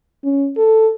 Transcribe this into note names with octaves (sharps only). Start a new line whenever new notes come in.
C#4
A4